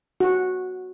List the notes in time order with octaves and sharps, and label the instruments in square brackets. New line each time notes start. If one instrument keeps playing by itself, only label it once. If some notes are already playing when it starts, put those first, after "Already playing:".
[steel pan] F#4